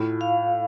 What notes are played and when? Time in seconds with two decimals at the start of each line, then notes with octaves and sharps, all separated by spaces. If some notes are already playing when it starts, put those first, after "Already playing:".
Already playing: A2 F4
0.21 F5